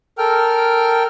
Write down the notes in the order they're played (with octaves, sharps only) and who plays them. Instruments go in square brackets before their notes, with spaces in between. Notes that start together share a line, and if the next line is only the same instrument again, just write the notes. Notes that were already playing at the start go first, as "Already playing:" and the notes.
[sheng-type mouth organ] A4 A#4 G5 F6